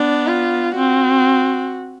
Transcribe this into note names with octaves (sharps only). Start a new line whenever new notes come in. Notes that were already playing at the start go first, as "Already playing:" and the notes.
Already playing: B3 D4
F4
C4 F#4